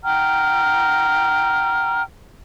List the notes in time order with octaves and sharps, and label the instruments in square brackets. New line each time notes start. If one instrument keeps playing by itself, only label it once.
[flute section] F#5 G5 A#5 F6